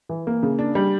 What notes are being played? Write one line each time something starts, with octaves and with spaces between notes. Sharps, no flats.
E3
A#3
C#3
D4
G3